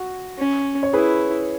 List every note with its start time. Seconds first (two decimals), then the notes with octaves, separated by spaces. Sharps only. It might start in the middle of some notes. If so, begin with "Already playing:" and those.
Already playing: F#4
0.38 C#4
0.83 C#5
0.93 E4 G#4 B4